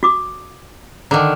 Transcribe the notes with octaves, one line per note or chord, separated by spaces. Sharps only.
F#4 D6 D#6
D3 D#3 A#5 D6